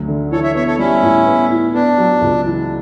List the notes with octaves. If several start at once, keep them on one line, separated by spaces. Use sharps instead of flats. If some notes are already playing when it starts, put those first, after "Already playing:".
Already playing: D2 F#3
D3
E3 A4 C#5
C#5 E5
B3 C#5 E5
A4 C#5
G3 C#4 E4
A2
B3
E4
B3 D4
F#3
C#2
E3